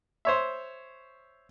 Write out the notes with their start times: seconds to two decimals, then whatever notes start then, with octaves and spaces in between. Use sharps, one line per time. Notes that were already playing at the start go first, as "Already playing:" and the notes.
0.25 C5 C#5 E5